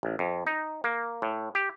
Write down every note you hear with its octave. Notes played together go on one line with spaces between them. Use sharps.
A1
F2
D#4
A#3
A2
G4